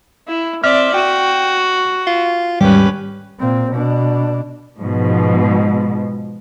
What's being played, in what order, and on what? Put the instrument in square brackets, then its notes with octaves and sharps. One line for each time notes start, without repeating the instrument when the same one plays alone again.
[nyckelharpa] E4
[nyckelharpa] C4 D5 [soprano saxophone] E5 [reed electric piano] F6
[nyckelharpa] F#4 [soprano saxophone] G5
[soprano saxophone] F4
[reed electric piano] D#2 G#2 G3 [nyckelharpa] C#4 B4 [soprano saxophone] G4
[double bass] A#2 C4
B2 D4
[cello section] G#2 B2 F3